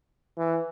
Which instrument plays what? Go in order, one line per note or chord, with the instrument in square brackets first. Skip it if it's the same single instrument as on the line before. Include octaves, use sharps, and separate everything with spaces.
[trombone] E3